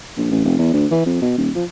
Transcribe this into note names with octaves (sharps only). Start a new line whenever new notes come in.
A#1
A1
F1
E2
D2
E3
F2
B2
D#1
F3